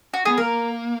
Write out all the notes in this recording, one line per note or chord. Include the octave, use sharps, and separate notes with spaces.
F#4
B3 G#4
A#3 A#4